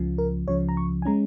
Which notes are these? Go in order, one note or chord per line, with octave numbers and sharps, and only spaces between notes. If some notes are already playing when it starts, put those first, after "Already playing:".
Already playing: C#2 C#3 F3
A#4
C#2 C#3 F3 C#5
A#5
C#6
G#5
G#3 C#4 A#5